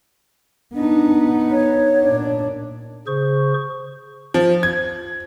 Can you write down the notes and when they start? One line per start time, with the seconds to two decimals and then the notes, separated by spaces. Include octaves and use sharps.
0.74 B3 D4 D#4
1.51 C#5
2.02 A#2 D4
3.07 C#3 G#4 C5 C#6
4.34 F3
4.63 G#6